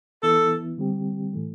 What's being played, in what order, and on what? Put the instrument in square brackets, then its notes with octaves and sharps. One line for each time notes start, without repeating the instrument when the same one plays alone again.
[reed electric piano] E3 B3 E4 [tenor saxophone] A4
[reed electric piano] D3 G3 C4 G4
A2 E3 A3